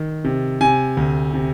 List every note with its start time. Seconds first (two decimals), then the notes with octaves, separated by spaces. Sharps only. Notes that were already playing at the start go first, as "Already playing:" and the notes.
Already playing: D#3
0.24 C3
0.61 C3 G#5
0.97 D2
1.34 C3